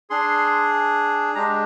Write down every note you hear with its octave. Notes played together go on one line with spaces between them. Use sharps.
D4 G#4 C6
G#3 D4 G4 A#5